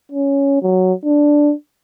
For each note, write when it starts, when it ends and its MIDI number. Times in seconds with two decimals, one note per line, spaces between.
0.12 0.62 61
0.62 0.93 54
1.05 1.53 62